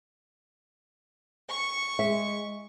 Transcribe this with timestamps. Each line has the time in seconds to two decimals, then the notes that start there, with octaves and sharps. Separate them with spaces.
1.49 C#6
1.99 G#3 E5